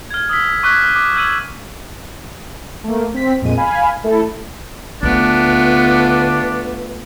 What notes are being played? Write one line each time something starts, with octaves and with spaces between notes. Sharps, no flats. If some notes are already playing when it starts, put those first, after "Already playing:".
F6 G#6
D#6 E6 B6
C#6 D6 F6 F#6 G#6 B6
D6
E6 G6 G#6 D#7 E7 F#7
A3 A#3
C4 B6
F2 A#2 G#3 D#7
F5 G#5 B5
A3 E4 A4
D2 A3 B3 D4 F4 B4